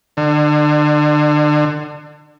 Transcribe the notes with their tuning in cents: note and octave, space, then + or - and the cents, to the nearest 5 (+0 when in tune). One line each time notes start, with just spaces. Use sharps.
D3 +30